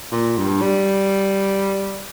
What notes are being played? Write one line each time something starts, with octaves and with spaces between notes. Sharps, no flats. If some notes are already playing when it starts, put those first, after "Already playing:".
A#2
G2
G3